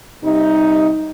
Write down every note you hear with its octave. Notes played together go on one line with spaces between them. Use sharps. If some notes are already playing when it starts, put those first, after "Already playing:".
C3 G3 D#4